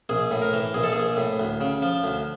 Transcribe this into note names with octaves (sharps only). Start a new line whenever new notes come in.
A#1 G#4
A2
A#4
E3
A#1 G#4
A4
A#1 G#4
A2
D2
C#3
F3
D2